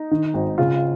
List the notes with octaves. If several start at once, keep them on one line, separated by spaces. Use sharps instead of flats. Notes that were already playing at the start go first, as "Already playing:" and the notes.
Already playing: D#4
D#3
G#1
C#3 F4